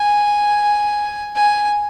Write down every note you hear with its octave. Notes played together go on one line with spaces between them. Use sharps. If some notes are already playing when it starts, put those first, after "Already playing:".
Already playing: G#5
G#5